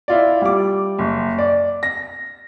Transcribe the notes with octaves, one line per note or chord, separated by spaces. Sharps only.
E4 F4 D5
G3 D6
F#1
D5
A#6